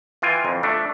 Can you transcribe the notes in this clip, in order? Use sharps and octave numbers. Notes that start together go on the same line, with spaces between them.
E3 F4 G5 G#5
F2
A3 D4